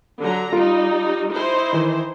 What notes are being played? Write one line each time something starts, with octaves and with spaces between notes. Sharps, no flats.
D3 F#3 A#5
G3 D#4 F4
D#4 E4 C5
D#3 E3